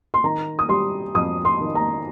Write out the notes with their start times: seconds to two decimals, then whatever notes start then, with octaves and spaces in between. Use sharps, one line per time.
0.14 C6
0.24 D#3 A#5
0.59 D#6
0.69 G3 C6
1.15 F2 D#6
1.45 C6
1.61 D#3
1.75 A#5